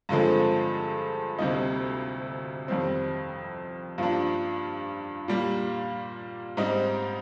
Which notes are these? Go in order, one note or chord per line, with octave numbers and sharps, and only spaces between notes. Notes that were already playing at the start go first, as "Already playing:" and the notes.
G2 D3 F3 G#3 C4
D2 C3 G3 A#3 D#4
F2 D#3 G3 C4
G2 F3 A#3 D4
A#2 G3 A#3
G#2 G3 C4 D#4